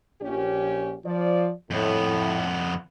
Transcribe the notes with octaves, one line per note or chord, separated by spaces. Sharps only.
A#1 C#4 G4
F3 D5
F2 A2 B3